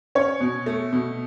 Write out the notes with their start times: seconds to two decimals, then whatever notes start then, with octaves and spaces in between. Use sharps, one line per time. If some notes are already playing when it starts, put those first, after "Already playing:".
0.15 C#4 C#5
0.40 B2
0.66 A3
0.93 B2